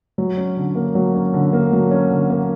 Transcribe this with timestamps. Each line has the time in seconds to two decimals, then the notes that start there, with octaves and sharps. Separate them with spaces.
0.18 F#3
0.37 C#4
0.57 D3
0.75 A#3
0.95 F#3
1.15 C#4
1.34 D3
1.53 A#3
1.73 F#3
1.91 C#4
2.11 D3
2.30 A#3